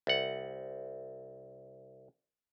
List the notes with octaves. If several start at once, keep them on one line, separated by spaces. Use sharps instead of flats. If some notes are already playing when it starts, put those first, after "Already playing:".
C2 F#5